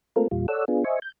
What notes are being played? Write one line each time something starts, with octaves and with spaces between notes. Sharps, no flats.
A3 A#3 C4 F4 A4 A#4
E2 A#2 G3 F4
A4 C#5 D5 F#5 E6
B3 D4 F4 G#4
C5 D#5 E5 G#5 C#6
G6